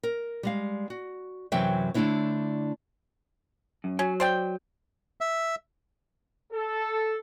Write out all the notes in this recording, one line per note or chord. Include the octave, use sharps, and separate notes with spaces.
A#4
G3 G#3 F5
F#4
F#2 C3 E3 F#3 E5 G5
D3 A3 C4 D4 E4 C#5
F#2
F#3 C#4
C5 D5 G5
E5
A4